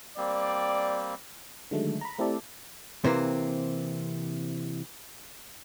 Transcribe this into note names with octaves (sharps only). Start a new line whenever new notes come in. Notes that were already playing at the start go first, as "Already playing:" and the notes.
G3 A#3 C4 D5
D3 D#3 F#3 G#3 A3
A#5 B5
A3 C4 E4 G4 A4 D5
C3 E3 A#3 C4